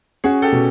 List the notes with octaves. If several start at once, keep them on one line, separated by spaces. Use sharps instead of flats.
C#4 F#4 G#4
G4 A4
B2